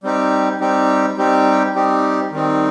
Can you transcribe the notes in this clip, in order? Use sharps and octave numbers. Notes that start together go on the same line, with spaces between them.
G3 C4 D#4 G4
G3 C4 D#4 G4
G3 C4 D#4 G4
G3 C4 D#4 G4
D#3 G3 C4 D#4